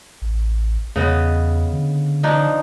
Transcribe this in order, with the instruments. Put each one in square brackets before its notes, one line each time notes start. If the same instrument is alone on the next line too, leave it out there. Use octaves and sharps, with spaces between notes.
[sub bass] A1
[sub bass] E2 [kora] C#3 B3 D#5
[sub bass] D3
[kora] F3 D4 D#4